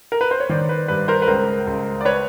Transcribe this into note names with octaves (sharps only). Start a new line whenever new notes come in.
A#4
B4
C5
C#5
D#3 C5 D5
B4
G2 B4
A#4 C5
B4
C#2 A#4 C5
C#2
D5
B4 C#5